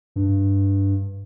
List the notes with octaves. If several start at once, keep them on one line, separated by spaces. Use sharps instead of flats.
G2